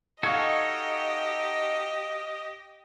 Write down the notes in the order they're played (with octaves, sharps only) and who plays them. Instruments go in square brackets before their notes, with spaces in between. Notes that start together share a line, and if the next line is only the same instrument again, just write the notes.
[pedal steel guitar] D#4 F#4 A4 [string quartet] G4 [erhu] D#5 [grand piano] F5 C#6 G#6